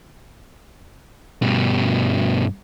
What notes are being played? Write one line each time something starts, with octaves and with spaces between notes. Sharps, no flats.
G2 B2